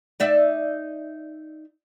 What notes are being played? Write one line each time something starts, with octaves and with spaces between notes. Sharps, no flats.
D#4 D5 E5